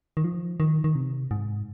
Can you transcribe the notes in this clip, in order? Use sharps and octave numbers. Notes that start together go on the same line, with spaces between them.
D#3
F3
D#3
D#3
C3
G#2